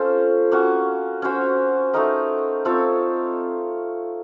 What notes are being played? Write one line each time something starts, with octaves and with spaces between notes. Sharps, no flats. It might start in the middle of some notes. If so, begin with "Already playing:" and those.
Already playing: C#4 F4 A4 C5
A#3 C#4 F#4
C#4 F#4 C5
A3 D#4 A#4 D#5
C4 F4 A4 C#5